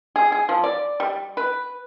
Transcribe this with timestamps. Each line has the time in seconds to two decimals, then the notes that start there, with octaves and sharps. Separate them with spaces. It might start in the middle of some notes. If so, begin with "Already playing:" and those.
0.16 G#4
0.32 G#4
0.49 F3
0.64 D5
1.00 G3
1.37 B4